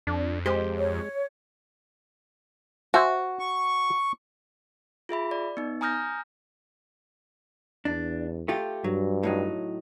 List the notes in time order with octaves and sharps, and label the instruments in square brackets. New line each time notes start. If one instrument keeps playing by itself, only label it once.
[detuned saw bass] F2 [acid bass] D4
[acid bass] G#3 [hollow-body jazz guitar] G4 C5 G#5
[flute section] C#5
[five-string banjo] F#4 [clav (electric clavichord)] C5 E5 G#5
[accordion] C#6
[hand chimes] F4 G#4 E5 B5
D5
B3 D#4
G#5 A#5 D#6 F6 G6 A#6
[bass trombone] E2 [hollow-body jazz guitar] D4
[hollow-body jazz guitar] A3 F4 G4
[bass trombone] G2 [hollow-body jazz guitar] F#3
[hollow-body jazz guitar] A2 F#3 D#4